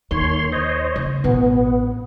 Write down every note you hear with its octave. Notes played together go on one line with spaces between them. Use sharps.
D#2 D#3 C#5 C6
C5 C#5 D#5
C#3
A1 B2 B3